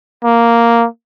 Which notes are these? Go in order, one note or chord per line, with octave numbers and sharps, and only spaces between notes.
A#3